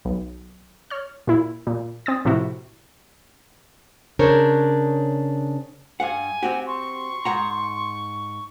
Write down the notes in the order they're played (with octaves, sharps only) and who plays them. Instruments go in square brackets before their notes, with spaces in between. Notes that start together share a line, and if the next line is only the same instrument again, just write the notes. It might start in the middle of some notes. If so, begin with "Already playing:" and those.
[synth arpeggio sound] B1
C#5 F6
A#2 E4
A#2
C4 D#6 A6
A2 C3 F3 E4 F#4
[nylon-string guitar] C#3 D4 A#4 C5 C#5
[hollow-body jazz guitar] G2 F5 F#5 [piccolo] G#5
[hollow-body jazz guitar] C4 F#4 G4 [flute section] F#5
[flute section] C6 [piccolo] C#6
[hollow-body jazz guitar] G#2 F#5 A#5